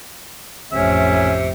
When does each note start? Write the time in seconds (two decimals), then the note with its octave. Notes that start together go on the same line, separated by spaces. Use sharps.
0.72 A1 F2 C3 C#4 E5